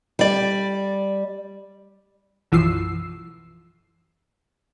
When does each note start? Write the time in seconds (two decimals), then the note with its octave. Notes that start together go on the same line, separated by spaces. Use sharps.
0.19 G3 D5
2.52 B1 F#2 E3 F3 E6 C7